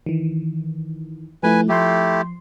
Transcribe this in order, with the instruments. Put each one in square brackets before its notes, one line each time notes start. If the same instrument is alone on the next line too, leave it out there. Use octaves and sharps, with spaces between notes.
[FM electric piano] D#3 E3
[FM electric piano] F3 A3 E4 [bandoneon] B4 G#5
[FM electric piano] F3 C6 [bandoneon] A3 E4 G4